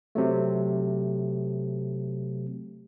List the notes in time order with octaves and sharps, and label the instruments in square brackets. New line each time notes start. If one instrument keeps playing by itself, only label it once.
[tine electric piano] C3 F#3 A3